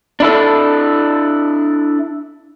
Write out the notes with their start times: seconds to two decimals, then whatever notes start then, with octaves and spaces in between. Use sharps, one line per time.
0.20 D4 E4 A4